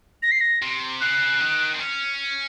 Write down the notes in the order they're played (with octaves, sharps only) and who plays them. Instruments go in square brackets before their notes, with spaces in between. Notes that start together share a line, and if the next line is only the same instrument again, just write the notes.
[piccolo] A#6
C7
A#6
[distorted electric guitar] C3
[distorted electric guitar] C#3 [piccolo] F#6
[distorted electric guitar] D#3
C4
C#4